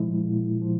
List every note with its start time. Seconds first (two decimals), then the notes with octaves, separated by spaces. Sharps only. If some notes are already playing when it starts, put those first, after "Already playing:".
Already playing: A#2 F3 G#3 E4
0.25 A#2
0.62 F3